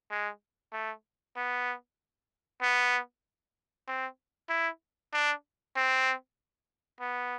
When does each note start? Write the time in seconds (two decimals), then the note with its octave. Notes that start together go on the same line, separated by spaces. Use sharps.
0.11 G#3
0.73 A3
1.36 B3
2.62 B3
3.87 C4
4.49 E4
5.13 D4
5.76 C4
7.00 B3